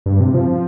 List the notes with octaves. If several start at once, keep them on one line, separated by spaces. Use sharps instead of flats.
G2
C3
F3